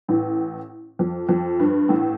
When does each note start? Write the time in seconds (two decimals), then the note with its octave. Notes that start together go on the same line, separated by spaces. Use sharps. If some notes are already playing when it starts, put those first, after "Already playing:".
0.08 A1 A2
0.99 F2
1.29 F2
1.60 G2
1.89 A1 A2